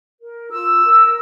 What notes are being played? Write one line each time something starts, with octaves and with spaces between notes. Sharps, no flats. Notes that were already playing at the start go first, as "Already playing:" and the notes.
A#4
F4 E6
A#4